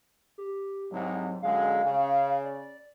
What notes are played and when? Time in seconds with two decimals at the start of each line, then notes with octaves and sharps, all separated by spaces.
0.38 G4
0.92 C2 G#2 C3 F#3
1.42 F#2 D3 G#3 F5
1.83 C#3
2.44 D5